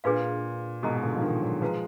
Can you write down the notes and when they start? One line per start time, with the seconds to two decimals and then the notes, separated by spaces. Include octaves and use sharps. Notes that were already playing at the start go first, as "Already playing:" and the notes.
0.04 A#2 D4 G#4 B4 F5
0.83 G#2 B2 F#4 A#4 D#5 A#5
1.02 A#2 D3
1.17 F3
1.22 B2 D#3
1.42 D#3 F#3
1.61 F3 G#3 F#4 B4 F5 A#5